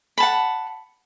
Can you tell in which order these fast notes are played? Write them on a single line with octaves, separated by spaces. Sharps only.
B5 A5 F#5